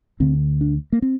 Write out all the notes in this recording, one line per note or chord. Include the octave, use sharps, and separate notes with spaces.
D2 D3 C4
D4
A#3
C4